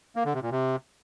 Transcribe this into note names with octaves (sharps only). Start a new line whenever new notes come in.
A#3
D3
C3
A#2
C3